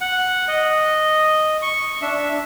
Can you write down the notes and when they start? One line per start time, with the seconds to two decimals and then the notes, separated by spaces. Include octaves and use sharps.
0.01 F#5
0.48 D#5
1.62 C#6
2.02 D4 E5